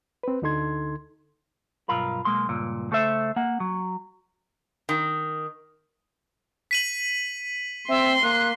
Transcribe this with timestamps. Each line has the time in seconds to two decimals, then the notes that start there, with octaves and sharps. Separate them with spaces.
0.23 C4 B4
0.42 D2 D3 D#4 A4 C6 G#6
1.88 B1 G2 F4 A#4 B5
2.25 B1 G#3 A#3 C6
2.49 C#2 G2 A#2
2.91 C#3 A3 A4 C5 E5
3.36 A#3 F#5
3.60 F#3
4.89 D#3
6.71 B6 D#7 F#7
7.89 C4 E5 C6
8.23 A#3 F#6